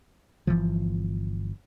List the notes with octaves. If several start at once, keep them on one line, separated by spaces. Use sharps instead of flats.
G1 C#3 E3 F3